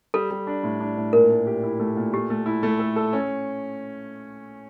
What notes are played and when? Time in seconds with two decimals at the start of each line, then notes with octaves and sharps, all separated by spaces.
0.14 G3 A4
0.31 G3
0.47 D4
0.63 A2
0.81 D4
0.97 A2
1.13 A#2 A#4
1.30 A3
1.47 G4
1.63 E4
1.80 A3
1.97 A#2
2.13 A3 G4
2.30 A3
2.46 E4
2.63 A3
2.80 A4
2.96 A4
3.13 C#4